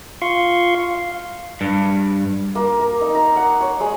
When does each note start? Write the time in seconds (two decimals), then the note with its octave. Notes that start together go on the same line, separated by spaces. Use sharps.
0.22 F4 F5 C6 C#6
0.91 F5
1.61 G2
2.55 A#3
2.80 A#4
3.01 D#4
3.15 A#5
3.36 F#5
3.61 C#5
3.80 G#3